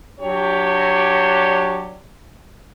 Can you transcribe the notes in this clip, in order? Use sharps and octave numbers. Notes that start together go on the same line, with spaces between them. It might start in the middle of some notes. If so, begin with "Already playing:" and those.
F#3 D4 G4 C#5